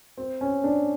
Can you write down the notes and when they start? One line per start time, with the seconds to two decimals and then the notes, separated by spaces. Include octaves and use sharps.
0.17 C4
0.41 C#4
0.64 D4